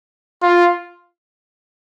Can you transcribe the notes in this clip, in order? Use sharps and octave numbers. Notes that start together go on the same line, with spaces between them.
F4